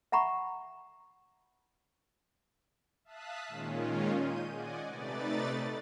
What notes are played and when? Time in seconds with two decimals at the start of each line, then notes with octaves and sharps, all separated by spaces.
0.12 E5 F#5 A#5 B5 C#6
3.05 E5 F5 A5 D#6 F#6 B6
3.48 A#2 D#3 G#3 C#4 F4
4.13 G6 D#7
4.51 D5 D#5 F#5 G#5
4.87 C3 A3 D#4 B4 D5 A6